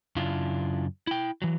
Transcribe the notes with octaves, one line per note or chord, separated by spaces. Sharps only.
F#2 C#3 D4 E4 F4
E4 G5
E3 F#3